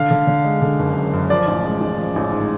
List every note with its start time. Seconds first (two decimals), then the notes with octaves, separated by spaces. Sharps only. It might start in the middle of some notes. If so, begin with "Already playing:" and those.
Already playing: D3 F5
0.11 D3
0.27 D3
0.44 G#3
0.62 D3
0.79 F#1
0.96 F#2
1.13 F#2
1.30 F3 D5
1.47 A1
1.64 G#3
1.81 A1
1.98 F3
2.16 A1
2.32 G#2